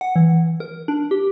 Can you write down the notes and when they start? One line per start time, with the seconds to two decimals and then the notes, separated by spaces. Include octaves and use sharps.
0.01 F#5
0.16 E3
0.60 A#4
0.88 D4
1.11 G4